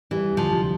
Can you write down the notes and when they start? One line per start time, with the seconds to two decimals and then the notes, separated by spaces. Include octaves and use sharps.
0.11 E3 G3
0.31 D2
0.37 F3
0.51 C3